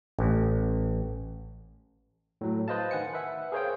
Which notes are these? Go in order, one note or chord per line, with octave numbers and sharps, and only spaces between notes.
A1
A2 F#3
B4 C5 D#5 F5 A5
D#3 F#5 G#5 C#7
B4 E5 F#5
G#4 A#4 C5 C#5 F5 G5